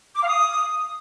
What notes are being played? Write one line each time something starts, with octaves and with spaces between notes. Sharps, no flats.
D6
F5
D#6